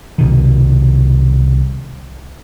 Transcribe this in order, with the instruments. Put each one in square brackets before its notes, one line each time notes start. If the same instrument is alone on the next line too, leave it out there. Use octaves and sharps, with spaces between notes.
[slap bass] C2 B2 D#3